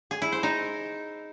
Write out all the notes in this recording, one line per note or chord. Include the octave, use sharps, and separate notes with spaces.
G#4
E4
C5
D#4